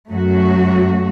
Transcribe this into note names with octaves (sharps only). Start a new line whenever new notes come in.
F#2 F#3 A3 F#4